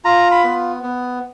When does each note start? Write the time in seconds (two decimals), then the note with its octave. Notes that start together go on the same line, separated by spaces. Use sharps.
0.05 F4 A#5
0.31 B5
0.44 B3
0.83 B3